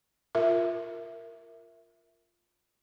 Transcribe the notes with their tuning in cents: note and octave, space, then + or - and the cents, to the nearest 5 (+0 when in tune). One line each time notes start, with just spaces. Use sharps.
F4 +0 A#4 +0 E5 +0